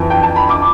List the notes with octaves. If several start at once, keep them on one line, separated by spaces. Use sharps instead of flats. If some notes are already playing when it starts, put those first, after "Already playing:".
Already playing: F2 E3
G5
A5
B5
D6